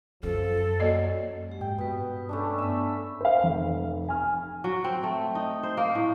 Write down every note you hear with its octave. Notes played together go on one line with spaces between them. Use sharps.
F#2 F3 A4
F#3 A#3 D5 D#5
G#3 G4
G#2 G5
G2 B2 B4 D#6
A3 C#4 D4 B5
B3 E5 B5
C5 F5
F1
G#5 F6
F#3
C4
A3
D#4
C5
A#3
A2